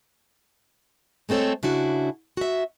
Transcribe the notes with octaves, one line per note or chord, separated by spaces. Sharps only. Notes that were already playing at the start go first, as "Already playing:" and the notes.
G#3 A3 C4 A4 C#5
C#3 D4 E4 F#4
F#4 E5